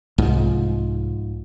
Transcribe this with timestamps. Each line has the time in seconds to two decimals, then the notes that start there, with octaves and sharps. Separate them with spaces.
0.18 C2 G#2 F3